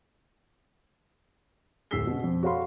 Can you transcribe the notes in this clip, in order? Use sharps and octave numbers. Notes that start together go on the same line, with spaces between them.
D1 E6 B6 C7 G7
B2 C#4
F2
F#4 A4 C#5 F5 B5 C6